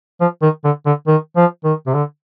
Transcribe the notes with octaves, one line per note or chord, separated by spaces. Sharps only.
F3
D#3
D3
D3
D#3
F3
D#3
C3
D3